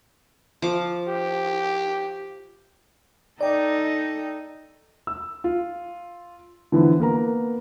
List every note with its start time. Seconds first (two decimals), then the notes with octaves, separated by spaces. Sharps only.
0.62 F3 D6
1.08 G4
3.41 D#4 A4 D5 G5
5.07 E6
5.44 F4
6.72 D3 E3 F3 B3
6.99 A#3 B3 A#4 A#5